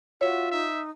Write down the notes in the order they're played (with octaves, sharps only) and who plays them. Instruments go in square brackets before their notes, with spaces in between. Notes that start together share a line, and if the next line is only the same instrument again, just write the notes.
[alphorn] F4 [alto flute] F#4 [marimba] C#5 [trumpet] E5
[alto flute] D#4 [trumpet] E5